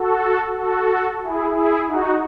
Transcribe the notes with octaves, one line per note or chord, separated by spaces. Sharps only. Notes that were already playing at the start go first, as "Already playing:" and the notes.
Already playing: F#4 A4
F#4 A4
E4 G#4
E4 G#4
D#4 F#4